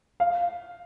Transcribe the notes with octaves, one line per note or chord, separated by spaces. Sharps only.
F5